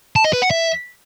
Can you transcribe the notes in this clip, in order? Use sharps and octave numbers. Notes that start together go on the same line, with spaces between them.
A5
D#5
B4
F#5
E5